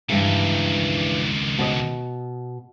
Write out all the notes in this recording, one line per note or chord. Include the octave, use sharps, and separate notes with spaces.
C#2 G2 D#3 E3
B2 D#5